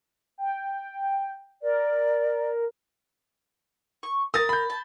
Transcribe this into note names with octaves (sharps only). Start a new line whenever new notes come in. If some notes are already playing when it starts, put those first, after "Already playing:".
G5
A#4 D5
C#6
A#4 D#6 A6
B5 G6
A5